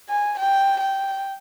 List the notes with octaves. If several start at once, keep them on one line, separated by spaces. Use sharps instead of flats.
G#5
G5
G5